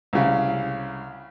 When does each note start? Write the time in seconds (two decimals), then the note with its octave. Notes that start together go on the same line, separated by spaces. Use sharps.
0.13 C2 C#3